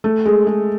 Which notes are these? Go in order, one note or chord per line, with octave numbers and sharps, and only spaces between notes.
A3
G#3
G#3